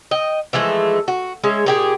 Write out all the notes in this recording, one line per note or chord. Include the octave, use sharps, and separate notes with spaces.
D#5 G5
E3 F3 G#3 A3
F#4
G#3 C#4 E5
A#2 G4 G#4